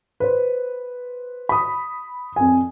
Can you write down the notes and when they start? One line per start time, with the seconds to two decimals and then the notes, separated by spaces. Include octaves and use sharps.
0.20 B4 C5
1.49 B5 D#6
2.36 F2 G#5